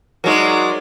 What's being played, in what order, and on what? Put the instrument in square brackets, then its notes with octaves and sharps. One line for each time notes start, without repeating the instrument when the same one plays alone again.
[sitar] F#3 G#3 [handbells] D#4 A#4 [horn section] F#4 C#5 D5